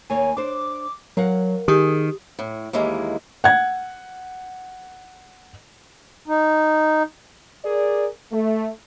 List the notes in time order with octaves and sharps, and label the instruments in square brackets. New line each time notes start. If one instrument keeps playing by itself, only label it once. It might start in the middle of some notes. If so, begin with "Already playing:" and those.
[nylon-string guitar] D#2 A#3 C#5 [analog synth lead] G#5
[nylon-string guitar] D4 C5 [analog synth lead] D6
[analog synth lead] F#3 [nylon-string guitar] A#4 F5 F#5
[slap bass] D#3 [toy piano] G4 D#6 [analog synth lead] G#4
[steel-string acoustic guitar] A2
D#2 E3 G#3 A#3
[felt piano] F#5 G#6
[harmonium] D#4
[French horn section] G#4 A#4 D5
A3